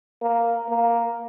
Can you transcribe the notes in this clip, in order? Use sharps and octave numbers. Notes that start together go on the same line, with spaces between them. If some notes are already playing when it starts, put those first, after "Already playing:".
A#3
A#3